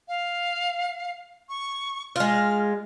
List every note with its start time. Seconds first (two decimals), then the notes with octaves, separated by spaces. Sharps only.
0.08 F5
1.49 C#6
2.16 G#3 F4 F6